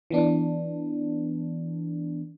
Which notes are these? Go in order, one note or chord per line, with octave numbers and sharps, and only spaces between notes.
E3 B3 D4